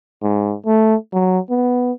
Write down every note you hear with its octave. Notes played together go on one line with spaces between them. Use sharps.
G#2
A3
F#3
B3